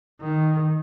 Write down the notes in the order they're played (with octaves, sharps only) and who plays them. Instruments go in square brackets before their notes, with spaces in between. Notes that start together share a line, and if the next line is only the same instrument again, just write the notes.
[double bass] D#3